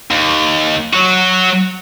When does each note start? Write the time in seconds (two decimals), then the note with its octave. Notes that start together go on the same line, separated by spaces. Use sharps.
0.11 D#2
0.94 F#3 F#4